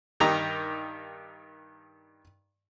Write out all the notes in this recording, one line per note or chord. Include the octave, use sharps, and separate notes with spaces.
G2 D#3 D#4 G4 A#5